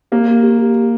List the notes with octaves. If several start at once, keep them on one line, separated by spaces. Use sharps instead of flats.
A#3 G4
G4
G4
G4
G4